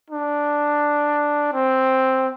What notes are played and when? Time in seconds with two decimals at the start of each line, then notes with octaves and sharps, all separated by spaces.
0.10 D4
1.53 C4